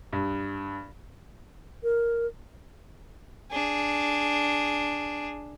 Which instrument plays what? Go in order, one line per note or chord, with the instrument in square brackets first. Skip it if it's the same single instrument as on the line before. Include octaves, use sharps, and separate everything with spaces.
[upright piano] G2
[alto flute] A#4
[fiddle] D4 G#4